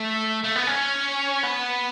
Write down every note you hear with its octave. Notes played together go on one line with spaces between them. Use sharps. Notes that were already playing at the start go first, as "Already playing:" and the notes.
Already playing: A3
A3
B3
C#4
B3